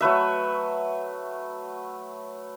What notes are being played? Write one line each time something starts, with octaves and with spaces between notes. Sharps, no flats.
F#3 A3 B4 E5